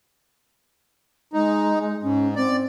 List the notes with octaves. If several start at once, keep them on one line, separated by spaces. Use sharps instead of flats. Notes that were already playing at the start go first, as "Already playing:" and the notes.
G#3 D#4
G#2 C#4
C4 D5